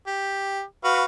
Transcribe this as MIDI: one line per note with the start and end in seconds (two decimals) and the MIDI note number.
0.07 0.62 67
0.84 1.05 66
0.84 1.05 71
0.84 1.05 77